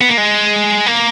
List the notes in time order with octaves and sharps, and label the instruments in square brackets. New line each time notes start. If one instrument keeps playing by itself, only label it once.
[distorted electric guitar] B3
A#3
G#3
A#3